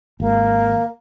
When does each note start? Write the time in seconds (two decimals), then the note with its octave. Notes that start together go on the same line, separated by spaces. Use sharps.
0.20 G#1 A#3